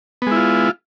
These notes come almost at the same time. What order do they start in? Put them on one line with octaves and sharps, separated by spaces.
B3 G#3 E4 F4